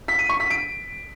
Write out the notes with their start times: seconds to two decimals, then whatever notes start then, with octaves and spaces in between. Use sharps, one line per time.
0.08 B6
0.19 D#7
0.29 C#6
0.40 B6
0.50 D7